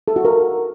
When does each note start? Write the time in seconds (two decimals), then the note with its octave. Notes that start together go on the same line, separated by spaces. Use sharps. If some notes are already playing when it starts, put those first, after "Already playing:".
0.08 A4
0.16 F#4
0.25 A#4